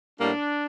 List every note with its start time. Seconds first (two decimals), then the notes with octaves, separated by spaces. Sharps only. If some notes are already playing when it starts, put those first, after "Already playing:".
0.20 A2 G3 A#3 D4